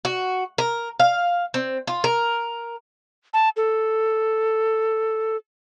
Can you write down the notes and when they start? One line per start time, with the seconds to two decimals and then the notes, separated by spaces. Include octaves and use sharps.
0.05 F#4
0.58 A#4
1.00 F5
1.54 C4
1.87 F4
2.04 A#4
3.33 A5
3.57 A4